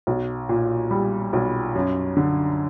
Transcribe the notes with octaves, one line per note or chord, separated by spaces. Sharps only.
B1
A#2
G3
B1
F#2
D3